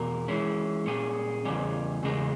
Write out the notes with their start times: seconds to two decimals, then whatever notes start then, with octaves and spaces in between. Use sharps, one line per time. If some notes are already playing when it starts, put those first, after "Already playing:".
Already playing: E2 B2 A#4
0.28 E3 G#3 C#4
0.86 A#2 G3 C#4 G#4
1.45 E2 C#3 G3 C#4
2.03 E2 C#3 G#3